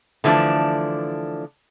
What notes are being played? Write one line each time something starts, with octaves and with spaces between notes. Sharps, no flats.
D3 E3 F3 A3 D4